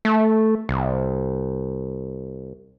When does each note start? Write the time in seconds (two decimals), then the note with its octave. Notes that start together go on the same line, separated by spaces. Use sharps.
0.05 A3
0.69 C2